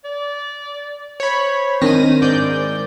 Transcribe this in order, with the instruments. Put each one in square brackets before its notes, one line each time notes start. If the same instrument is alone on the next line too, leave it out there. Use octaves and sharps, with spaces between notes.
[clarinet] D5
[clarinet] C5 [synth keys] C#5 B5
[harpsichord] D#3 [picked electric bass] C4 D4 [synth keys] A#6 D#7
[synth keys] G#2 D5 G6